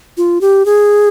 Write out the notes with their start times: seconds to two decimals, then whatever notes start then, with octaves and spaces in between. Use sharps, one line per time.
0.17 F4
0.41 G4
0.66 G#4